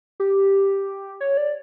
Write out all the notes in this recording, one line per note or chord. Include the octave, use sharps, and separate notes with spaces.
G4
C#5
D5